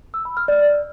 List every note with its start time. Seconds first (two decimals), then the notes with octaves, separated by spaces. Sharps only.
0.14 E6
0.25 B5
0.37 F6
0.48 D5